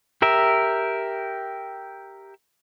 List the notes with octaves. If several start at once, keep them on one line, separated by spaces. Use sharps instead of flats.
G4 A#4 E5